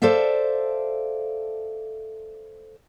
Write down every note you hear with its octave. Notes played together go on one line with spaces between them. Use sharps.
A4 C5 D5 E5 F5